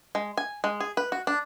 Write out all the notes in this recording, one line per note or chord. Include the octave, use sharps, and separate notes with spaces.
G#3
G#5
G#3
G#4
B4
F#4
D4